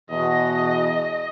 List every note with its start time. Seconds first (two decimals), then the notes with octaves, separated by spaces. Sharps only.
0.10 E2 B2 D#5